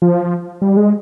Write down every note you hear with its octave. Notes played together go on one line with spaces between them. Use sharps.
F3
G3
G#3